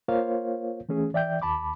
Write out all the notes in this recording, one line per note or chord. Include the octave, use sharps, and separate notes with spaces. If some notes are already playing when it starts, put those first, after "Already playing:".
A#3 F4 A#4 C5 C#5 F5
E3 A3 C#4 G#4
E3 D5 E5 G5 G6
D#2 A5 B5 D6